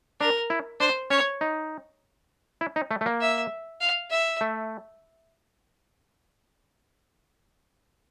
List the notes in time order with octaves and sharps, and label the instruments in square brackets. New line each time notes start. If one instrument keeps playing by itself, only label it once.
[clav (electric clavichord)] D4 [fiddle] A#4
[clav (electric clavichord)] E4
[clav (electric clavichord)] D4 [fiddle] C5
[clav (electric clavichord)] C#4 [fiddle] C#5
[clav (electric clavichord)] D#4
E4
D#4
A3
A3
A#3
[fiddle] E5
F5
E5
[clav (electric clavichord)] A3